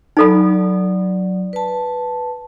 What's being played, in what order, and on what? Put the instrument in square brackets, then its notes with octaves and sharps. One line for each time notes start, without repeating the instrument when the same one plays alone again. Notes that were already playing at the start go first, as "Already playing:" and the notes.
[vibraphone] F#3 D5 [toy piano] D#4 A4 B5
[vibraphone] B4 A5